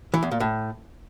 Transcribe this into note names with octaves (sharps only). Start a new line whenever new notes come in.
E3
E2
A#2
A2